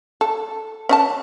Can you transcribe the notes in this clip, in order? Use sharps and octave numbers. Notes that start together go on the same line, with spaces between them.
A4
C#4 D#5 A5